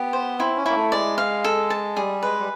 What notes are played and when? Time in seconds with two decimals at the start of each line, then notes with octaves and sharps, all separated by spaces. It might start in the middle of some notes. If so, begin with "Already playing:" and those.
Already playing: B3 G4
0.13 C5
0.39 C4 E4
0.57 C#4
0.66 A#3 E4
0.75 A3
0.92 G#3 D5
1.18 F5
1.44 A4
1.70 A5
1.96 G3 G#4
2.23 G#3 B4
2.40 G3